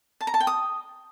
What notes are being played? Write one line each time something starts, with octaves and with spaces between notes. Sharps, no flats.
A5
A#5
A5
G5
D#6